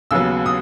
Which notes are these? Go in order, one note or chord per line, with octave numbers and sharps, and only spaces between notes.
D#2 C#3 F#3 B3 E6
D#6